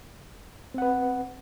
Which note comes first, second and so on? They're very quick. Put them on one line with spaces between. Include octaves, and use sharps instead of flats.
C4 F#5 B4